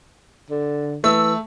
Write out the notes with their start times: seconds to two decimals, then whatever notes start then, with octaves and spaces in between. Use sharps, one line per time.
0.50 D3
1.04 E3 A3 E6